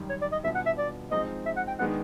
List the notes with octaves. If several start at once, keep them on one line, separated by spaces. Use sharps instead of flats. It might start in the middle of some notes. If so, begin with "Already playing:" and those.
Already playing: F#2 D#3 G3
C#5
D5
D#5
B2 G3 B3 D4 F4 E5
F#5
E5
D5
F3 G#3 C4 D#4 D#5
E5
F#5
G5
D#3 G#3 B3 D4 F#5